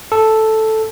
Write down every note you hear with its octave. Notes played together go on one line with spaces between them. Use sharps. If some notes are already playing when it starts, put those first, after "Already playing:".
A4